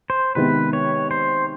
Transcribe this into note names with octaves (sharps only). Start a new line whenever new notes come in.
C5
C3 D#3 G#3 B3 B4
C#5
C5